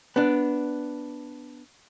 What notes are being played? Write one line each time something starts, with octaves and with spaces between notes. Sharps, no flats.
B3 D4